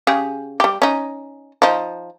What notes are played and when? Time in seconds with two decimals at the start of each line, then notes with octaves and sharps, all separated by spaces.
0.07 C#3 G4 G#4
0.60 G3 G4
0.82 C#4 D#4
1.62 F3 D#4